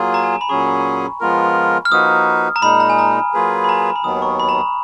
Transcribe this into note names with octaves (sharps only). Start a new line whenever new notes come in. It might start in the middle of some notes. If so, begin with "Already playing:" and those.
Already playing: F#3 A#3 F4 G#4
A#5
G#5
A#5
B5
A#2 F#3 C#4 G#4 C#6
F3 G#3 B3 F4 A#4
F6
F3 A#3 D#4 F#4 B4 D#6
A#5
A#2 G#3 D#4 B5
A#5
G#5
A#5
F#3 A#3 F4 G#4 B4
B5
A#5
G#5
A#5
B5
D#2 D#3 F#3 B3 D#6
C#6
B5
A#5